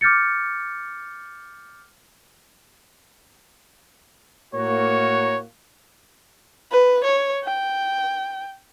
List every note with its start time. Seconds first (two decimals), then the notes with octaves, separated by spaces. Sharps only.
0.01 D6 F6 G6 A6 C#7
4.54 A2 A#3 F#4 C#5
6.71 B4
7.04 C#5
7.44 G5